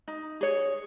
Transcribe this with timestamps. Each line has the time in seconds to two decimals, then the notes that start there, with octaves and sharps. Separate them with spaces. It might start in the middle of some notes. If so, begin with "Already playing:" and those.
0.08 D#4
0.41 G#4 C#5